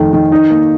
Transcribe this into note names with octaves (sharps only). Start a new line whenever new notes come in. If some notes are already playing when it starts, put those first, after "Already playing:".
Already playing: F1 D#3 A3
D#3
D#4
A#3